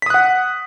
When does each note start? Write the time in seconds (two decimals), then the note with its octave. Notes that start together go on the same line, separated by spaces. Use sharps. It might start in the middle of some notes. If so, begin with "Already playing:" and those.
0.02 B6
0.06 D#6
0.10 F#6
0.14 F#5